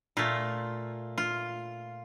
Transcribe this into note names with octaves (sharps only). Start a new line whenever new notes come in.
A#2 A3 F4
F4